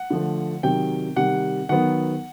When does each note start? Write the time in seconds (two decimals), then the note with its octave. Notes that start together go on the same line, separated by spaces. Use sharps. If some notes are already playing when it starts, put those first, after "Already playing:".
Already playing: F#5
0.10 D3 F3 A3
0.63 C3 D#3 F#3 G5
1.16 C3 D#3 G3 F#5
1.69 D#3 F#3 B3 F#5